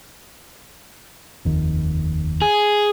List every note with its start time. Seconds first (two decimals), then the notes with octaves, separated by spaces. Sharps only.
1.45 F1 D#2
2.42 G#4